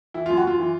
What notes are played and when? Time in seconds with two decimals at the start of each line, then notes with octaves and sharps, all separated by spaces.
0.14 E3 E4
0.26 F#2 F4
0.37 F#4
0.44 F#2 F4
0.59 E3